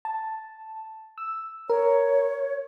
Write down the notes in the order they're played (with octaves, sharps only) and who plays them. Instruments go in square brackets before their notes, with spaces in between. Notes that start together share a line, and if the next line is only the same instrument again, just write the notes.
[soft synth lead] A5
E6
[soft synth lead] A#4 [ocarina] C#5